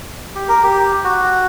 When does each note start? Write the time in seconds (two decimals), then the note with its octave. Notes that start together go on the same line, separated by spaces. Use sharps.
0.35 G4
0.48 A#4
0.63 G4
1.04 F#4